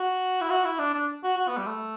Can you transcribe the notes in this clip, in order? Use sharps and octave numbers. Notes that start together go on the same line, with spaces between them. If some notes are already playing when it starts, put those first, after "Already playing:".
Already playing: F#4
E4
F#4
E4
D4
D4
F#4
F#4
B3
G3
A3